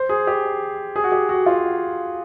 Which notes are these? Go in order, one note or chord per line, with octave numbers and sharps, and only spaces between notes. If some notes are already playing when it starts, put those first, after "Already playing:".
Already playing: C5
G#4
G4
G#4
F#4
G4
F#4
F4